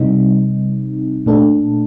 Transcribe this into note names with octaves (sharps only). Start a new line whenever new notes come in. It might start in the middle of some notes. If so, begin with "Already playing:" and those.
Already playing: C3 G3 C4 D#4
A#2 A3 D4 A4